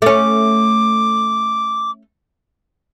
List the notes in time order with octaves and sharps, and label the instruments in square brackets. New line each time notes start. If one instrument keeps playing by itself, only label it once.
[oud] A3 C#4 [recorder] D6